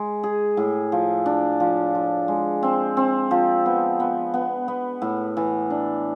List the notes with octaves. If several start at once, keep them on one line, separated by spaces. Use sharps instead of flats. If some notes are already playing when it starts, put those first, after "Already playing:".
Already playing: G#3
G#4
A2
F3
D4
F3
F3
G#3
C4
C4
F3
B3
B3
B3
B3
A2
E3
D4